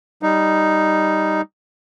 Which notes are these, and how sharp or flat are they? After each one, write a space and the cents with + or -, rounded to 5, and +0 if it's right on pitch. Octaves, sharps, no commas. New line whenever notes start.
G3 +0 D#4 +0